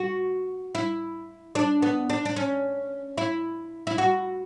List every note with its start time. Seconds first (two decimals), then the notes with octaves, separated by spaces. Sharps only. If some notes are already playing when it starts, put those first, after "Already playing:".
Already playing: F#4
0.75 E4
1.55 D4
1.82 B3
2.10 D4
2.25 D4
2.36 C#4
3.17 E4
3.87 E4
3.98 F#4